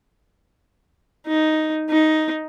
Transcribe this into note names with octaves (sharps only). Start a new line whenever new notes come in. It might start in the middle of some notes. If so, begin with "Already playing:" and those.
D#4
D#4